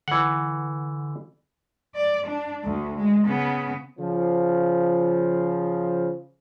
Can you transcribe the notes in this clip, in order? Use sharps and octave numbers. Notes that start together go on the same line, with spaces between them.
D3 E3 F#5
D5
D4
D2 D3
G#3
C#3 B3
C#3 F3